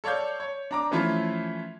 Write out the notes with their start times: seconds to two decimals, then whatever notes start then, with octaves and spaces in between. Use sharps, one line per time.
0.04 A4 C#5 D5 F5 G6
0.40 C#5
0.71 D4 A#5 D6
0.91 E3 F3 A3 C#4 E4 F4